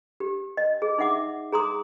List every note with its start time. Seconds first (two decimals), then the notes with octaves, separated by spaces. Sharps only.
0.20 G4
0.57 D#5
0.82 G#4
0.98 D#4 E5 F#5 D6
1.53 G#4 A#5 C6 D#6